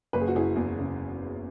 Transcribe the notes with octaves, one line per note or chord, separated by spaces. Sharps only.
F#1 B4
G#4
F#4
F#1 E4 G#4
E2
C#3